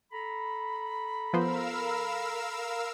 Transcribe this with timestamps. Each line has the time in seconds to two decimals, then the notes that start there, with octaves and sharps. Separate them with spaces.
0.11 A4 A#5 B5
1.33 F3 B3 A#4 C5 F5 E6